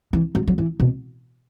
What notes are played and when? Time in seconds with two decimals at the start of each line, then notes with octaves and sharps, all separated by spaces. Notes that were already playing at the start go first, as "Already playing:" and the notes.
0.13 E3
0.35 F#3
0.48 F#3
0.58 E3
0.80 B2